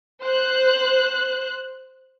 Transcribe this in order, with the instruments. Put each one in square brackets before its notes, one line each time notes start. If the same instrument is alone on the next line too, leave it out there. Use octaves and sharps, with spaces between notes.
[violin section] C5 F#6